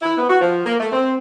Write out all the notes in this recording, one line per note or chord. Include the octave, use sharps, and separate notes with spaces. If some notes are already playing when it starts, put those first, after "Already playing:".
E4
B3
F#4
F3
A#3
A3
C4